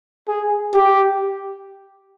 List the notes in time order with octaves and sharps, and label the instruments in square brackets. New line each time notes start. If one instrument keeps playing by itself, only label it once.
[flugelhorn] G#4
G4